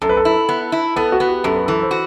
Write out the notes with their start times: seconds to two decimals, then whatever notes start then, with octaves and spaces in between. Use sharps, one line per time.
0.02 F#2 A4
0.09 B4
0.17 A4
0.25 E4
0.49 B3
0.72 E4
0.96 B3 A4
1.12 F#4
1.20 B3
1.29 G4
1.44 F#2 A4
1.55 B4
1.66 E3 A4
1.82 C5
1.91 F#4